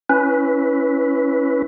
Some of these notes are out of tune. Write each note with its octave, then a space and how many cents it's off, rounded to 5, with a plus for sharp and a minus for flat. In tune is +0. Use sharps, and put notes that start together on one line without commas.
C#4 +0 E4 -5 B4 +0